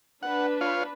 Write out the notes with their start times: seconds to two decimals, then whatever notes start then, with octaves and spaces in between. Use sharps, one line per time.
0.23 D4 B4 F#5
0.61 F4 C#5 F5